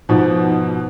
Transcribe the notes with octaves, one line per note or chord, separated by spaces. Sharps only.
G#2 B2 F3